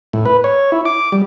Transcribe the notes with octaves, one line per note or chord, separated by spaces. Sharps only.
A2
B4
C#5
E4
D6
G3